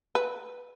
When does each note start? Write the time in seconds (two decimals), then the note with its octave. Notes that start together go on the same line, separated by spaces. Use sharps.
0.15 B4